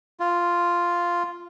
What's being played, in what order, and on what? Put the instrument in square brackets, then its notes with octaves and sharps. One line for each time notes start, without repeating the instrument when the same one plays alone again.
[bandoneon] F4